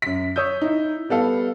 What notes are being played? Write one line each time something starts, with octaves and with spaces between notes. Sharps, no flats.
F#2 B6
C#5 D#6 E6 G6
D#4 E4
G3 B3 A4 F5